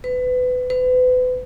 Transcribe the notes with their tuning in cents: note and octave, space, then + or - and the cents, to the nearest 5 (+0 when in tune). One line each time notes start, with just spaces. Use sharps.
B4 +25
B4 +35